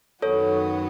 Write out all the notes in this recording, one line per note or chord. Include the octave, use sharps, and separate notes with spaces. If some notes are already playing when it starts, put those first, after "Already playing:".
F#2 D#3 F#3 B3 F#4 A4 C#5